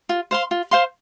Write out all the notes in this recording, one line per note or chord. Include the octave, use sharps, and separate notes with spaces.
F4
C5 F5 C6
F4
C5 F5 C6